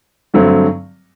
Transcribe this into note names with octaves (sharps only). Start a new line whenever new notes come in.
G2 D3 F#3 A3 C4